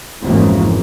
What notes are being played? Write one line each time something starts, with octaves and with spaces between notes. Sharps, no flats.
G#1 F2 G#2 C#3 E3 A#3